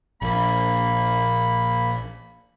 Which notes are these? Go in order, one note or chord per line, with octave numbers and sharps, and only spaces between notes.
A#1 A#3 B5